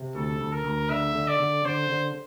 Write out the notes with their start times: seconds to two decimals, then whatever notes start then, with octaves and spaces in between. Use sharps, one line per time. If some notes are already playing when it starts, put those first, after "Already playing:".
Already playing: C3
0.15 D2 A4
0.41 D2
0.52 A#4
0.64 D2
0.90 D3 E5
1.15 D3
1.28 D5
1.40 D3
1.65 D3 C5
1.90 D3